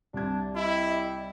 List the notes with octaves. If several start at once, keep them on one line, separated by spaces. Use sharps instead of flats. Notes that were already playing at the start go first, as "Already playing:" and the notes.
C2 D4 G#6
G3 E4 D#5